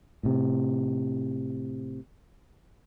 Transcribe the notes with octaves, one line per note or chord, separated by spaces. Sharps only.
A2 C3